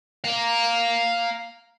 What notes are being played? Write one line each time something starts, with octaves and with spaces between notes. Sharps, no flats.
F5 A#5